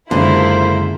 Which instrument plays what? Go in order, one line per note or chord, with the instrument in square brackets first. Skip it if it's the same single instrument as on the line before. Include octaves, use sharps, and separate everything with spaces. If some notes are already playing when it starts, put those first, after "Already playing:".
[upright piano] F#1 G#3 F5 [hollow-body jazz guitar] D3 [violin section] E4 F4 A#4 [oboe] C5